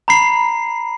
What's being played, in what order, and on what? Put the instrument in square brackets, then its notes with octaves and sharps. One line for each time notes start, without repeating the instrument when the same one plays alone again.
[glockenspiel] A#5 B5 C7